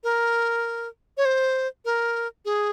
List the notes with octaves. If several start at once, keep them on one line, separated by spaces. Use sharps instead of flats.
A#4
C#5
C5
A#4
G#4